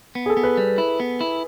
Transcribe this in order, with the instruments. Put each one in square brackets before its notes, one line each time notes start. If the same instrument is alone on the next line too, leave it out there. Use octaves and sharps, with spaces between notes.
[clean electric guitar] B3
[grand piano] G#4
A4
[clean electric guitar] B3
[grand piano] B4
[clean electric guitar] G3
E4
B3
E4